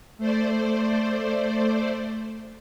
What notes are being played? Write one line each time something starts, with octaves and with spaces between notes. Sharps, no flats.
A3 C5 D5